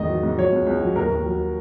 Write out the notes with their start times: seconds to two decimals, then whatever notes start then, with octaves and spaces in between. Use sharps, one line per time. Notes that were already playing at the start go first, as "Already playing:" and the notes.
Already playing: E2 G#2 D#3 D#5
0.09 F#3
0.23 G#2
0.38 F#3 C#5
0.52 C#2
0.67 C#2
0.82 F#3
0.96 D#2 A#4
1.10 D#2
1.26 F#3